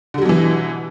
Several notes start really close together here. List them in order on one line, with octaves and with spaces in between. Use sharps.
D3 G3 F#3 B2 E3